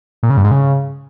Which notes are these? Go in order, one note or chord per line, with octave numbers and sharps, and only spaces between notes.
A#2
C#3
G2
G#2
C#3